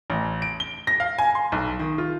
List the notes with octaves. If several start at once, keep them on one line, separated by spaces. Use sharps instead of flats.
A1
D7
G7
A#6
F5
G#5
C6
B1
D#3
F4